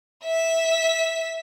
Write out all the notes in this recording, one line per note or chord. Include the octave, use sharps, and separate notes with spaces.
E5 B6